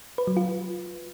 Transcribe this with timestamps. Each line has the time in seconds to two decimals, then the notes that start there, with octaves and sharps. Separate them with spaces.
0.18 B4
0.27 F#3
0.37 F4